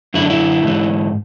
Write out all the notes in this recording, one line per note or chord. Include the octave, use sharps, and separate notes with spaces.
F#2 D3 E4
D4
E4
G#2 E3